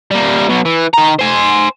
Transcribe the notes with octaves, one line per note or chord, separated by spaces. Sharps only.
G3 A#3
B2 F#3
E3
D#3 A#5
C5 G#5